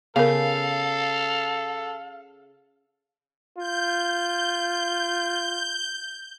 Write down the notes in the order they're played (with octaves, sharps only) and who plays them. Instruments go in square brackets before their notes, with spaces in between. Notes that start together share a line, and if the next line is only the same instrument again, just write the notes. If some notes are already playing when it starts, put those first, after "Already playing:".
[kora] C#3 [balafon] B3 A#4 [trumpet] A4 [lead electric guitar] F5
[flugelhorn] F4 [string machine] G6